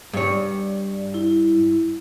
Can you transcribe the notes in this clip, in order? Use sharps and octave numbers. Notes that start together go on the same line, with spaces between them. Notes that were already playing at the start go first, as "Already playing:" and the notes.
G2 C#5 D5
E4